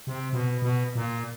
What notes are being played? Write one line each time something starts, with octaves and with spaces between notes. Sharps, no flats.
C3
B2
B2
A#2